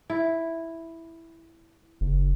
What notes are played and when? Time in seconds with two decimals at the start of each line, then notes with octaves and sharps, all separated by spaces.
0.10 E4
2.01 F#1